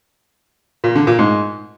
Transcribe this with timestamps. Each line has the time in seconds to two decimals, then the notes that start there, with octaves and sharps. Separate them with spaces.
0.84 A#2
0.95 D3
1.07 A#2
1.19 G#2